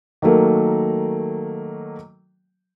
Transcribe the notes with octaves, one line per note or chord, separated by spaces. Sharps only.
D#3 F#3 A3 A#3